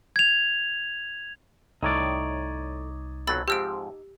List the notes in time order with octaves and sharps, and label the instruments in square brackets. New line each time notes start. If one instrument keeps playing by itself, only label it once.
[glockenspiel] G#6 F7
[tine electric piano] C2 [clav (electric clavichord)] A2 [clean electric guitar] D#4 C#5 D5
[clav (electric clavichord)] B1 F2 F#3 [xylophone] B5 E6 A6
[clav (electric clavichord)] G#2 F3 C4 [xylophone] G4 E6 D7